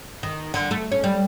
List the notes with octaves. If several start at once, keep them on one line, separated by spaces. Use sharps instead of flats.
D#3
D3
A3
C#4
G3